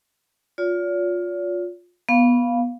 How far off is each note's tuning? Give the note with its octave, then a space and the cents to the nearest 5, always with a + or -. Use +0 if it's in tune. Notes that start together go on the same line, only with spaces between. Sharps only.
F4 +20 D5 -45
B3 -15 F5 +0